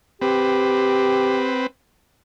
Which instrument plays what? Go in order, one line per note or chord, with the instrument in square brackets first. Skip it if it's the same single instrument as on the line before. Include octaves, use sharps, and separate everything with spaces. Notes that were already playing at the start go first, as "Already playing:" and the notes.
[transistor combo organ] C4 B4 [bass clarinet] G4